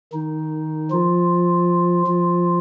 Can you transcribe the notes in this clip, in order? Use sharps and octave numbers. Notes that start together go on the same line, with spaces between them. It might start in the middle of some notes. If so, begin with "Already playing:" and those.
D#3 D#4
F3 F4
F3 F4